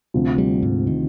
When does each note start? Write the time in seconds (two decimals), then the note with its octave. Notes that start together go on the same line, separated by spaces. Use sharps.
0.14 D2 C3 F3
0.38 G3
0.63 G#2
0.87 D#3